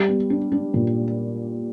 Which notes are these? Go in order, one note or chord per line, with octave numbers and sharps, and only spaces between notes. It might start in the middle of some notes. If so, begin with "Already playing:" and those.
Already playing: G3
B3
D4
D4
A#2